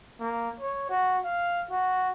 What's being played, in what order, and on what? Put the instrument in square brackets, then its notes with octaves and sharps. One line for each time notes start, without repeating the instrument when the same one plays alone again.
[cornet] A#3
C#5
F#4
F5
F#4